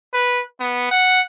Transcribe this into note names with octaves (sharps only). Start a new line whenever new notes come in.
B4
B3
F#5